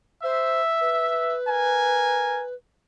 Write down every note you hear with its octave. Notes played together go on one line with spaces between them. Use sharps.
C5 E5
B4
A#4 G#5